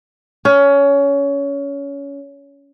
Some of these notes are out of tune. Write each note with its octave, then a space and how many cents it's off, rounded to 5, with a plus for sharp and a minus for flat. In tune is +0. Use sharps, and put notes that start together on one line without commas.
C#4 +20